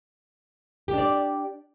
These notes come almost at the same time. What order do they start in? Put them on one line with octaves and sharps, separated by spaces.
G4 D4 D5